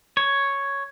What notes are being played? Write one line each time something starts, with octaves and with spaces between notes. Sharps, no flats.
C#5